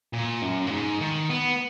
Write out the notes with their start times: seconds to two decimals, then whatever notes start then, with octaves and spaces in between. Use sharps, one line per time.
0.13 A#2
0.42 F#2
0.67 A#2
0.71 G#2
1.01 D#3
1.30 B3